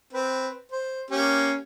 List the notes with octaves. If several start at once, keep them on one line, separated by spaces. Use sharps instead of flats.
C4 B4
C5
A#3 C#4 G4